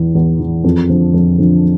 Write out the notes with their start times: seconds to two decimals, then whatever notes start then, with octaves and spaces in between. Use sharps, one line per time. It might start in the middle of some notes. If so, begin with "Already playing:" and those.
Already playing: E2 E3
0.15 E2
0.39 E3
0.64 F2
0.89 D3 F3
1.14 F2
1.38 D3 F3